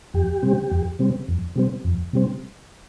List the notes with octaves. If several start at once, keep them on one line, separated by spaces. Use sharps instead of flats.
F2 G4
C3 G3 C4
F2
C3 G3 C4
F2
C3 G3 C4
F2
C3 G3 C4